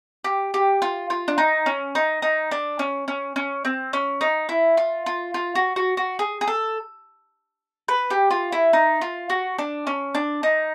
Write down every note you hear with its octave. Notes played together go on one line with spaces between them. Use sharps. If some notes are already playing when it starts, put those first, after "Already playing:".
G4
G4
F4
F4
D4
D#4
C#4
D#4
D#4
D4
C#4
C#4
C#4
C4
C#4
D#4
E4
F4
F4
F4
F#4
F#4
F#4
G#4
G#4
A4
B4
G4
F4
E4
D#4
F4
F#4
D4
C#4
D4
D#4